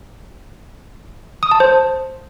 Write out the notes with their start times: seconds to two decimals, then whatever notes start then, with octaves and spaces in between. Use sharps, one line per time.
1.43 D#6
1.51 A5
1.60 C5